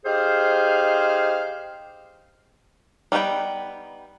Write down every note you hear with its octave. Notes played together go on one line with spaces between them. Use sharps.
D#4 G4 G#4 C5 F5
G3 B3 D#4 F#4 G5